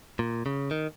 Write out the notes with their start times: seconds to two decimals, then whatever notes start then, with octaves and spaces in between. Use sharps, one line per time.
0.19 A#2
0.46 C#3
0.71 D#3